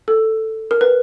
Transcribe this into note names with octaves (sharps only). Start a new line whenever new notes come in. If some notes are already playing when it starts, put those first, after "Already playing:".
A4
A#4
B4